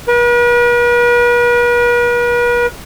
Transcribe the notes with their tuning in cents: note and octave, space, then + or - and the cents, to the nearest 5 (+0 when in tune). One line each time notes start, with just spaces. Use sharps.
B4 -45